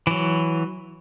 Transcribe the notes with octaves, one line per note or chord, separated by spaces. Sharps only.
E3 F#3